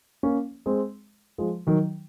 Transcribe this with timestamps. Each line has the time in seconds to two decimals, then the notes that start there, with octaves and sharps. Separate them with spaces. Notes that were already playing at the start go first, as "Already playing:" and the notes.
0.23 A#3 C#4
0.66 G#3 C4
1.38 F3 G#3
1.67 D#3 F#3